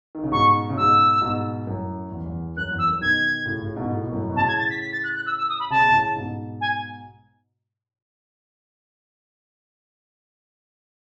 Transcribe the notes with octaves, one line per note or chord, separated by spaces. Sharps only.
D#3
C#3
G#2 B2 C#6
C#3
G#2 B2 E6
G#2 B2
F#2 A2
E2
E2
F#2 F#6
E2
E6
F#2
B2 D#3 G#6
A2 C#3
A2 C#3
G#2 B2
A2
B2
F#2 A2
B2
A2 C#3 A5
G#6
A6
B6
B6
A6
F#6
F#6
E6
E6
D#6
B5
C#3 A5
B2
A2 C#3
G#2 B2
G#5